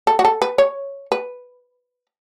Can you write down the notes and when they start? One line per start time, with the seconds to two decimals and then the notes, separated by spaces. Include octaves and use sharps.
0.07 A4
0.19 F#4
0.25 A4
0.42 B4
0.58 C#5
1.12 B4